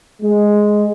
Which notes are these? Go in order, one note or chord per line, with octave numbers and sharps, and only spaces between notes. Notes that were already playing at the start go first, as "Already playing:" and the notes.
G#3